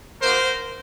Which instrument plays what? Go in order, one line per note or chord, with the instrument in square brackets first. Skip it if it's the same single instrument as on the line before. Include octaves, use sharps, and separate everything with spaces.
[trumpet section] A#3 D#4 F#4 A#4 C5